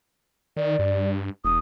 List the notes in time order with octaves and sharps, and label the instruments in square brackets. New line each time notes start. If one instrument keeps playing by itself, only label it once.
[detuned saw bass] D#3 [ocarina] D5
[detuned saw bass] G2
[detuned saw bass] E1 [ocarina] D#6